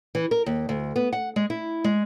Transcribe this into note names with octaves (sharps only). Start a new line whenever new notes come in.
E3
A#4
D#2
D2
B3
F#5
G#3
E4
G#3